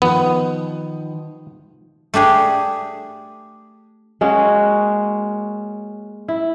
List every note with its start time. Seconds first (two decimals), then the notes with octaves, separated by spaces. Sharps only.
0.02 D#3 F3 B3
2.14 A3 D4 G4 G#4
4.21 G#3 A#3 C#4 F#4
6.28 E4